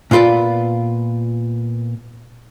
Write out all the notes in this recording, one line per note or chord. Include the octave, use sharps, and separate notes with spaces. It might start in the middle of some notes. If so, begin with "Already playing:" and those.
A#2 B3 F4 B4 D5